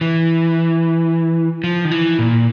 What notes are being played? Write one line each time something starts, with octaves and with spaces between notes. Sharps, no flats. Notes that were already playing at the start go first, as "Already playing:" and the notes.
E3
F3
D#3
E3
A#2